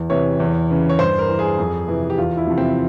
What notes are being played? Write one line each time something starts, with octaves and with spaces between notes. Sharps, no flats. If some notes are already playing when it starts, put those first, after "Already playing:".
Already playing: E2
C3 E3 C#5
E2
C#3 E3
C#5
G2 C5
A#4
E3
G#4
F2
C3 E3
G4
E2 F4
E4
C3 F3
C4